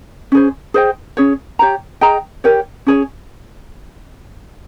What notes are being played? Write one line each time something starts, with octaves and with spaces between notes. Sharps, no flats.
C#4 G#4 C5
G#4 C5 D#5 G5
C#4 G#4 C#5
G4 C#5 G5 A#5
G#4 D#5 G5 A#5
G4 A#4 C#5 G5
C#4 G#4 C#5